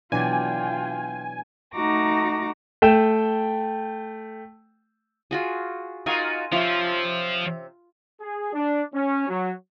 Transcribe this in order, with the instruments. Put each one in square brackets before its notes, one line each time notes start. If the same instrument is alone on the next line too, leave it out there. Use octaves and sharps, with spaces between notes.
[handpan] B2 D4 D5 [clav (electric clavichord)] E3 F#3 [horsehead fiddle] F4 G5 [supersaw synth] G#5
[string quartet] A3 D#4 F#4 A#5 D6 A#6
[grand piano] A3 G5 E7
[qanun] F4 F#4 G#4
[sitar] D#4 F4 F#4 [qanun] A#4 F5 G#5
[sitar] C3 C#4 E5 [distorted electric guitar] F3 [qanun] F4
[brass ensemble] G#4
D4
C#4
F#3